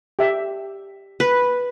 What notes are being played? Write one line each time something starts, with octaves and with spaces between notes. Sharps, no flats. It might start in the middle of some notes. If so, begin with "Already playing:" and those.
G4 E5
B4